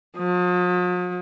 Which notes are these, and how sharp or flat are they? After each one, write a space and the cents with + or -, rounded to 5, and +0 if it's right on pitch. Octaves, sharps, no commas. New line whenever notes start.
F3 +45